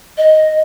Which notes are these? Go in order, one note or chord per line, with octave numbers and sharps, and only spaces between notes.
D#5